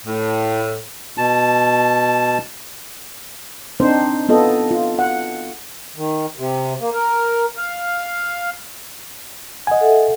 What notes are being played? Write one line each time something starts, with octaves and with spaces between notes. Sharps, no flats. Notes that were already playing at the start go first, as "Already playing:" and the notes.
A2
B2 A5
C4 D4 D#4 C5
B3 F4 A4 D#5
F4
F#5
D#3
C3
A#3
A#4
F5
D#5 F#5 G#5
A4 E5 F#5